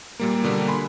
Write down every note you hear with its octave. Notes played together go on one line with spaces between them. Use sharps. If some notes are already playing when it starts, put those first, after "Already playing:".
A#2 G3 A#3
B2 D3 G3 A#3
G#5 B5 C6